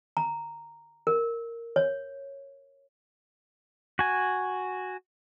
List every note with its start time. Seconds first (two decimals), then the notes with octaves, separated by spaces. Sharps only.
0.17 A#5
1.07 A#4
1.76 C#5
3.99 F#4 G#5